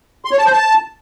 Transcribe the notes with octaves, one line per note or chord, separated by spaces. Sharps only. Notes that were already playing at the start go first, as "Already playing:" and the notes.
C6
C#5
A5
C5
A5